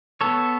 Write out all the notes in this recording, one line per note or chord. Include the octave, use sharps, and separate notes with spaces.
B3 A4 C#5